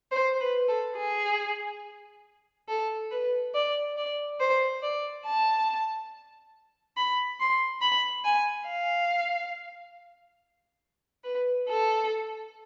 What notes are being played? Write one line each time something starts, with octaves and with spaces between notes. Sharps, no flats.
C5
B4
A4
G#4
A4
B4
D5
D5
C5
D5
A5
B5
C6
B5
G#5
F5
B4
A4